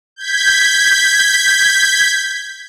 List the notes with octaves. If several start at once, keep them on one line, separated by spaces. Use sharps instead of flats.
G6 G#6 B6